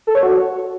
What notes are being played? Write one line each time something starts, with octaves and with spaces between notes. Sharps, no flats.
A4
C#5
F#4